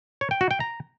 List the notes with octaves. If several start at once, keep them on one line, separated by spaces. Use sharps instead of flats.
C#5
G5
F#4
G5
A#5